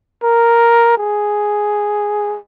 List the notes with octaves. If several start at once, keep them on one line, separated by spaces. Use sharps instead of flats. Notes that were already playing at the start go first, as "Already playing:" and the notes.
A#4
G#4